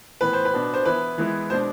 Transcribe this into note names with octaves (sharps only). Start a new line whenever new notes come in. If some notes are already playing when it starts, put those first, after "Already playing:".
A2 E3 B3 B4
C5
B4
B2 B3 D4
C5
E3 B3 E4 B4
E3 G#3 B3 E4
B2 G#3 D4 C5